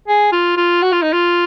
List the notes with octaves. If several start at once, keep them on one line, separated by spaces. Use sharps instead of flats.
G#4
F4
F4
F#4
F4
D#4
F4